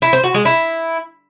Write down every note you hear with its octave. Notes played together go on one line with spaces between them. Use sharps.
E4
C5
F#4
G#3
E4